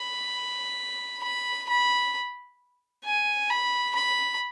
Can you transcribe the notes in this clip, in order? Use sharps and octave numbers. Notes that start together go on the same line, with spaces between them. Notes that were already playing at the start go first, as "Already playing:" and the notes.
Already playing: B5
B5
B5
G#5
B5
B5